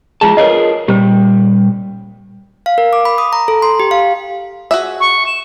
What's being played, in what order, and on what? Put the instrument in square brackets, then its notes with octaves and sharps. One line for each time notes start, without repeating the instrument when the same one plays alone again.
[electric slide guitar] F3 G#3 A5 [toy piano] F4 G#4
[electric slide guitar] F4 G#4 A#4 [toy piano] B4 C#5 D#5
[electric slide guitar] A#2 G3 [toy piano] G4 C5
[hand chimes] F5
A#4
D6
B5
D#6
A#5
A4
C6
G4
F5
[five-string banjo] F#4 G#4 E5
[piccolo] C#6
E7